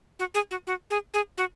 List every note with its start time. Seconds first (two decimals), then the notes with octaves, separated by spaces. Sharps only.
0.19 F#4
0.34 G#4
0.51 F#4
0.67 F#4
0.90 G#4
1.14 G#4
1.38 F#4